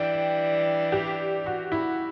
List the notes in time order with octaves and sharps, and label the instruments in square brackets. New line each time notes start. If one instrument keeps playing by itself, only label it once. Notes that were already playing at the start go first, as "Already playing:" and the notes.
Already playing: [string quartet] E3 G3 D4 [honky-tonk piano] G5
[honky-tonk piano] G4
F#4
E4